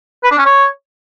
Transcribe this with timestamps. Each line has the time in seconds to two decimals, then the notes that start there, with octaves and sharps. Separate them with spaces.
0.24 B4
0.31 D4
0.38 C#4
0.46 C#5